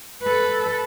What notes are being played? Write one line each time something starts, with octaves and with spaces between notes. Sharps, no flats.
A4 B4